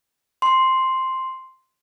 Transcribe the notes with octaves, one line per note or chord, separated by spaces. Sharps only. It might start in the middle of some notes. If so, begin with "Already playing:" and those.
C6